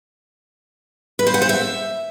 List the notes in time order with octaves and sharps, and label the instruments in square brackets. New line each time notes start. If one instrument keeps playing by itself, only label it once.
[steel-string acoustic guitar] B4
C5
F#5
C5
E5